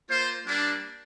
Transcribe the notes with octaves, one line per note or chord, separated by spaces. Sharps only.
A#3 F4 C5
G3 A#3 D4